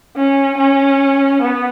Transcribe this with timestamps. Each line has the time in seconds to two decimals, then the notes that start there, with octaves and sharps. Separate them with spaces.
0.16 C#4
0.58 C#4
1.41 B3